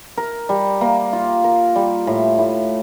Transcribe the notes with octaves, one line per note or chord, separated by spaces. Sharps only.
A#4
G3
A#3
F4
A#4
G3
A2
A2